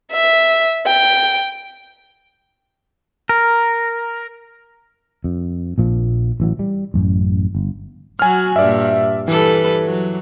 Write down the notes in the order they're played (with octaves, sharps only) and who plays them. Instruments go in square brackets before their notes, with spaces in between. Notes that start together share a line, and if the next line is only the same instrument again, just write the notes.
[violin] E5
G5
[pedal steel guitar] A#4
[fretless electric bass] F2
A#1 A#2 F3
A1 E3 F#3
G3
A1 F#2
G1
[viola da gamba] F#3 F#4 [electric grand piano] G#5 F6
[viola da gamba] G2 A#2 [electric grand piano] D5 E5
[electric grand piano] E3 [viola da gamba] G3 A4 B4
[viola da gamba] F#3